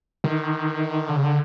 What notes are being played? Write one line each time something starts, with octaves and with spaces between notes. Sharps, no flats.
D#3
D3
C#3
D3